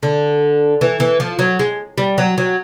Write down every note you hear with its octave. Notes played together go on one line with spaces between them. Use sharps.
D3
E3
E3
F3
F#3
G#3
G3
F#3
F#3